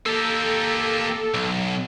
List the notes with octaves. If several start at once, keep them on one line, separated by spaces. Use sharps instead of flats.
A#3 G4 A4
B1